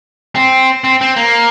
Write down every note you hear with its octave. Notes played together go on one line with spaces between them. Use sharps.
C4
C4
C4
A#3